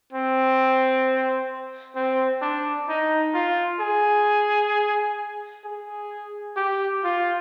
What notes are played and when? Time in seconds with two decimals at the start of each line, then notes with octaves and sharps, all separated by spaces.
0.13 C4
1.96 C4
2.42 D4
2.89 D#4
3.34 F4
3.80 G#4
5.65 G#4
6.56 G4
7.04 F4